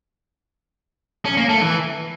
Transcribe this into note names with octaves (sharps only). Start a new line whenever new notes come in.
C#4
A#3
A3
E3